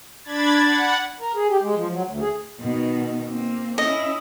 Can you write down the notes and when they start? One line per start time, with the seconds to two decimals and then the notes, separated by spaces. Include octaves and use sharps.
0.24 D4 B5 G#6 A6
0.66 F#5
1.20 A#4
1.35 G#4
1.50 G4
1.62 G#3
1.76 F3
1.93 F#3
2.07 D2
2.21 G#4
2.60 B2 D#3
3.30 A#3 C4
3.78 C#4 E4 D#5